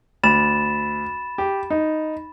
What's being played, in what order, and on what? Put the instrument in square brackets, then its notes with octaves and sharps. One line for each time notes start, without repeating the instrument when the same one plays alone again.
[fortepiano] D2 [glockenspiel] B5 A6 E7
[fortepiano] G4
D#4